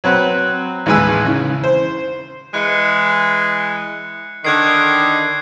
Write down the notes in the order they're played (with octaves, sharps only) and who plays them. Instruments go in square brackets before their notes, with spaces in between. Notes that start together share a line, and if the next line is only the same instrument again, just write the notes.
[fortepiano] F#3 C4 B4 F#5
A1 D#2 G#3 B4 G#5 E6
C#3 E3
C5
[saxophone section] E3 G#3 [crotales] F#6 C#7
[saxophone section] D3 D#3 [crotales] F#6 G#6 C7